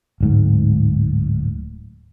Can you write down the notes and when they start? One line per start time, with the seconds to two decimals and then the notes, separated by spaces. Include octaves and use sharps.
0.21 D1 G#2